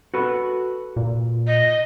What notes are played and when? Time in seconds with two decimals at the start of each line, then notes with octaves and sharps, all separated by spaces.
0.14 F#4 A4 B4
0.96 A#2
1.47 D#5